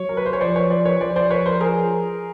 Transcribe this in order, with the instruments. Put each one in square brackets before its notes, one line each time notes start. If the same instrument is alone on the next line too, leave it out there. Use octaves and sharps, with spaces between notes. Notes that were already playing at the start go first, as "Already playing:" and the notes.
Already playing: [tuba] F#3 [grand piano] C#5
[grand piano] A#4
B4
C5
C#5
[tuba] F3 [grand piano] C5 D5
[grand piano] B4 C#5
C5 D5
B4 C#5
[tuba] F3 [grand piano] C5 D5
[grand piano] C5 D5
B4 C#5
A#4 C5
G#4 A#4